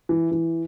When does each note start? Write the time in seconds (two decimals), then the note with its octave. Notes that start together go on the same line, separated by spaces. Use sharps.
0.09 E3
0.31 E3